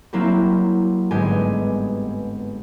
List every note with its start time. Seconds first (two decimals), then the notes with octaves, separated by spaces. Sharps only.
0.13 F#3 A#3 C4 E4 G4
1.11 G1 G#2 G#3 B3 G4 G#5